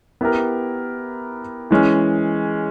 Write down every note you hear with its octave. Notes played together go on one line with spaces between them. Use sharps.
B3 E4 G4 A#4
E3 G#3 C#4